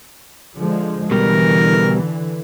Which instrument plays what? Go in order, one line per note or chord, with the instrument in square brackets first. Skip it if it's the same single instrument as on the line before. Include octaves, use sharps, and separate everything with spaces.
[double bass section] D3 F3 G#3
[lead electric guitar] B2 G3 [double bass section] D3 E3 [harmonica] A#4